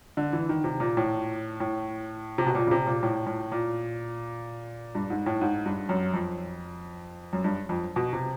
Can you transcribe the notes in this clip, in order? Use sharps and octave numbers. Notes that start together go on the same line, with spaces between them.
D3
E3
D#3
C3
A#2
A2
A2
C3
B2
A#2
C#3
C3
A#2
A2
A2
A#2
G2
G#2
A2
G#2
G2
F#2
F2
F#2
G2
F2
B2
C3